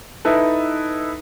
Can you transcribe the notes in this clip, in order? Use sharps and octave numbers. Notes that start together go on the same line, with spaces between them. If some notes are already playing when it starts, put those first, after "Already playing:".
D#4 E4 A4 B4